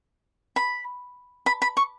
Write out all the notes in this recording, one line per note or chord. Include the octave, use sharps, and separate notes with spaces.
B5
B5
B5
C#6